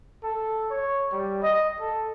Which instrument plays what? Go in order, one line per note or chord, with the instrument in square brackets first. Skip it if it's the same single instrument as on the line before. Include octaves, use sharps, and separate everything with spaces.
[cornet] A4
C#5
G3
D#5
A4